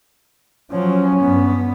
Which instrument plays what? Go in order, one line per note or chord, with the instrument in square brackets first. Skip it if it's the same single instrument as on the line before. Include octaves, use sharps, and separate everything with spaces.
[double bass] F3 F#3 [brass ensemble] C#4
[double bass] G2 B3